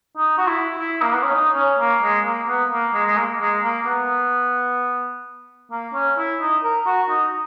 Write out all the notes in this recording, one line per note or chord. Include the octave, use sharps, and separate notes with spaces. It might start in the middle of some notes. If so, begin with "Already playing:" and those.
D#4
F#4
E4
E4
A#3
B3
C#4
D#4
C#4
A#3
G#3
A#3
B3
A#3
G#3
G#3
A#3
G#3
A#3
B3
A#3
C#4
E4
D#4
A#4
F#4
D#4